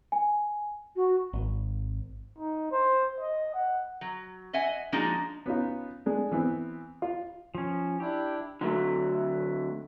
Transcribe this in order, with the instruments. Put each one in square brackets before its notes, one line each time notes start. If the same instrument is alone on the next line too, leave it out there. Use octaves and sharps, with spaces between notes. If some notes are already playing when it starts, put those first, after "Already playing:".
[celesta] G#5
[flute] F#4
[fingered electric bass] G#1
[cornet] D#4
C5
D#5
F#5
[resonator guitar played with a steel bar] F#3
D#5 E5 F#5 G#5
F3 G#3 A#3 D4 D#4 F#4
[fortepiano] B3 C#4 D#4 F4
G#3 D4
E3 B3 C4
F4
[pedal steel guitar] F3 C#4
[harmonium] D4 E4 [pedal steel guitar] G4
[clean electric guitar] D3 F#3 A3